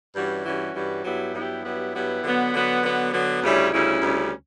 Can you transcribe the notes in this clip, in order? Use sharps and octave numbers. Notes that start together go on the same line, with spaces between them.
G2 E3 G3 C#4 F#4
G2 E3 G3 C#4 F#4
G2 E3 G3 C#4 F#4
G2 F#3 B3 E4 G4
G2 F#3 B3 E4 G4
G2 F#3 B3 E4 G4
G2 F#3 B3 E4 G4
D3 F#3 B3
D3 F#3 B3
D3 F#3 B3
D3 F#3 B3
D2 C#3 G3 C#4 E4
D2 C#3 G3 C#4 E4
D2 C#3 G3 C#4 E4